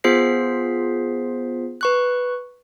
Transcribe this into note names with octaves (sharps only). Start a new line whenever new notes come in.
B3 F4 G#4 C5 B6 C7
B4 C#6 F#6